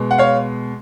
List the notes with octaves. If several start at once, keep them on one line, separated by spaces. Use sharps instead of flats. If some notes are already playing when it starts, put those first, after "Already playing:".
Already playing: B2 G#3
F#5
C#5 F5